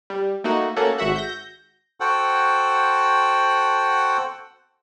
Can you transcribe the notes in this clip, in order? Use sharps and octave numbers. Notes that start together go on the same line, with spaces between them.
G3
A3 A#3 D#4 F#4
A3 A#3 C#4 F#4 A4
G#1 F#4 E5 F#5
G6 A#6
F#4 A4 C5 F#5 G5